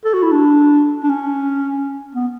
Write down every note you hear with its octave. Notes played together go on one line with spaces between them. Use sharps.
A4
F#4
E4
D4
D4
C#4
B3